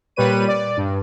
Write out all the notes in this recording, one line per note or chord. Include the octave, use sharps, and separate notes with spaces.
A#2 G3 B4 C#5 D#7
D5
G2